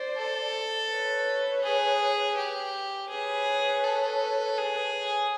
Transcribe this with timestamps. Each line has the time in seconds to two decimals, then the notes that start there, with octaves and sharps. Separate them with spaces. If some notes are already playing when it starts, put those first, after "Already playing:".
Already playing: C5 D5
0.17 A4
0.90 B4 C#5
1.63 G#4
2.37 G4
3.10 G#4 B4 C#5
3.84 A4
4.58 G#4